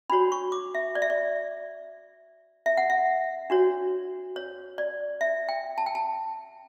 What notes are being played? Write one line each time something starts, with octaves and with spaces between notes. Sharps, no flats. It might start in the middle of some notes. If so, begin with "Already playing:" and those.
D4 F#4 C#5 B5
C#6
D6
E5
D5
E5
D5
E5
F#5
E5
D4 F#4 C#5
C#5
D5
E5
G5
A5
G5
A5